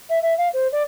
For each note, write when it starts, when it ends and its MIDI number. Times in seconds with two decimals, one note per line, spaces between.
0.09 0.21 76
0.22 0.36 76
0.37 0.48 77
0.53 0.67 72
0.72 0.82 74